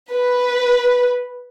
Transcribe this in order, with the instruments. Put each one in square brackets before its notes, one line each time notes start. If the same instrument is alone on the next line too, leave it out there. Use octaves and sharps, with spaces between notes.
[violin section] B4